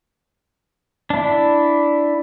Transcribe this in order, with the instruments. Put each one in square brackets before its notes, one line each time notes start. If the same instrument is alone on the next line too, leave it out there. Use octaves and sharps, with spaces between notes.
[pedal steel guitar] D4 E4